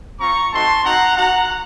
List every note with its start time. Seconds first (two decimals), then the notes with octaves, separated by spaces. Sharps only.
0.20 C4 F4 A#5 C#6
0.52 A3 C4 D#4 F#4 A5 C6
0.83 C4 D#4 F#4 F#5 A#5
1.15 A#3 D#4 F#4 F#5 A#5